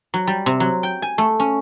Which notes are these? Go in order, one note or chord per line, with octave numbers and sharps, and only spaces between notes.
F#3
G3
C3
F#3
G5
G#5
A3
C#4